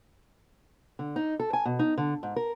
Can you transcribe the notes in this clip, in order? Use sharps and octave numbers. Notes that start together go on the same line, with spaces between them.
D3
D#4
A4
G#5
B2
D#4
D3
G#2
A#4